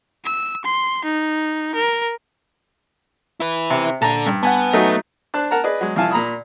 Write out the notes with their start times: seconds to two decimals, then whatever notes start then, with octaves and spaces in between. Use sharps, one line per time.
0.25 E6
0.65 C6
1.04 D#4
1.75 A#4
3.40 E4 B4
3.70 C3
4.02 A#2 D4 A4 A5 A#5
4.26 G2
4.43 B3 F#5 G#5 A5
4.73 F#3 A3 D#4
5.34 D4 C5 A5 F#6
5.51 A#4 F#5 A5 A#5
5.64 G#4 B4 D5 D#5
5.81 F#3 G#3
5.96 C2 F3 E4 F5 G#5 A5
6.11 A#2 A#5 B5 D#6